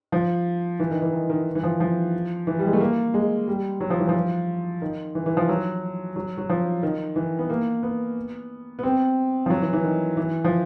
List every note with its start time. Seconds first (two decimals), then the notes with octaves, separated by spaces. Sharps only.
0.12 F3
0.80 E3
0.91 D#3
1.02 E3
1.13 D#3
1.30 D#3
1.55 E3
1.63 F3
1.80 F3
2.47 E3
2.59 G3
2.66 G#3
2.73 A3
2.81 A#3
3.14 G#3
3.48 G3
3.80 F#3
3.90 F3
4.00 E3
4.09 F3
4.82 D#3
5.15 E3
5.26 E3
5.37 F3
5.49 F#3
6.16 F#3
6.38 F#3
6.49 F3
6.83 D#3
7.16 E3
7.39 B3
7.50 A#3
7.83 B3
8.79 B3
8.83 C4
9.46 F3
9.50 F#3
9.62 E3
9.73 E3
9.84 D#3
10.17 E3
10.44 F3